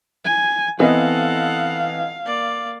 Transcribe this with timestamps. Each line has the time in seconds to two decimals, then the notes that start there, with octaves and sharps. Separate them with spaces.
0.25 G#5
0.80 E3 B3 C4 A4 D#5 F5 F#5
2.25 A#3 D5